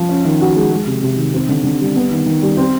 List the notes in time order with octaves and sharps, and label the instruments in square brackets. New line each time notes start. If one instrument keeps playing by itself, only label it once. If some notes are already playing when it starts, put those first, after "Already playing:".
Already playing: [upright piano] F3
C#4
D#3
F#4
G#3
G#3
C3
C3
D#3
C4
D3
D3
G3
B3
D#3
D#3
G3
C4